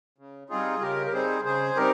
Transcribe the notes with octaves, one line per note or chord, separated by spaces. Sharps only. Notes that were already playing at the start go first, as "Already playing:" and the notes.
C#3
G3 C4 D#4 F4 G#4
C#3 G4 A#4
A#4
G3 C4 D#4 G#4 C5
C#3 G#4 C5
G3 C4 D#4 G4 A#4